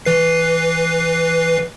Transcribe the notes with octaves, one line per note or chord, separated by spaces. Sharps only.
E3 B4 C7